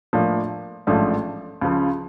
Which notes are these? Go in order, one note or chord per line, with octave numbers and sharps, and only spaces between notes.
A2 F3 A#3 D4
A1 G#2 F3 A3 D4
C#2 C#3 F3